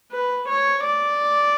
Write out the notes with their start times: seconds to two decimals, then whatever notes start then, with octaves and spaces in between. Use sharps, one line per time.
0.12 B4
0.48 C#5
0.84 D5